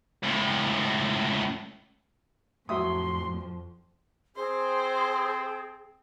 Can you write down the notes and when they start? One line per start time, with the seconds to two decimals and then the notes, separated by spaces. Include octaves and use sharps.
0.23 C#2 A2
2.69 F2 A2 F3 F#3 E5 C6 D#6
4.36 C4 G#4 C5